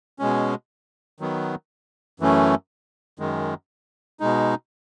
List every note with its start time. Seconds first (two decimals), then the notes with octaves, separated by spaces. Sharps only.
0.19 B2 G#3 C#4
1.20 D#3 F#3 B3
2.20 F#2 E3 A3 C#4
3.19 F#2 D#3 G#3
4.20 B2 G#3 D#4